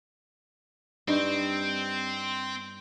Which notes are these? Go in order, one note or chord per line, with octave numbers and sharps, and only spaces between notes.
G2 C4 D#4